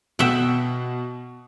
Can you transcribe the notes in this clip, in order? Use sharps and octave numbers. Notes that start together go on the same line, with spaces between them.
B2 E5 F#5 G5